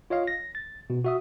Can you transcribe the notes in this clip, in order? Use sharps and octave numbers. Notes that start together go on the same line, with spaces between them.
F4 C#5 D#5 F5
A#6
A6
B2
F#4 E5 D#6